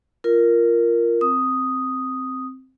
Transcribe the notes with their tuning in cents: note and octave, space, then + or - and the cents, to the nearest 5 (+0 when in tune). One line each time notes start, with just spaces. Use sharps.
F4 -15 A#4 +0
C4 +0 D#6 +0